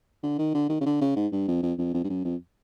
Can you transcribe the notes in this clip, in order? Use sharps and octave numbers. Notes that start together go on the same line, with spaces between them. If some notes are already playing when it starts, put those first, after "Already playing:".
D3
D#3
D3
D#3
C#3
D3
C#3
G#2
G2
F2
F2
F2
F2
G2
F#2
F2